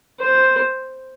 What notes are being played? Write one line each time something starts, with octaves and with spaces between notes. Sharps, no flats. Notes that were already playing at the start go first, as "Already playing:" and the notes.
C5